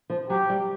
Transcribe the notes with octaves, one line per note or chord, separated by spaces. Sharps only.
F3
F#3 G4
G3